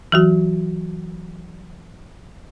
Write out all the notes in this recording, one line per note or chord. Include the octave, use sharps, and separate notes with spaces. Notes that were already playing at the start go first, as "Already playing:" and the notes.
E3 F#3 F#4